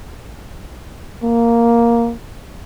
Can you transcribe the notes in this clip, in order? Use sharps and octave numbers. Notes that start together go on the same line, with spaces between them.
A#3